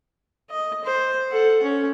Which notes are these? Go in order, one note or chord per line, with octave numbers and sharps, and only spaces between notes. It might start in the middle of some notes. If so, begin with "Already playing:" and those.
D#5
C5
A4 F#5
C#4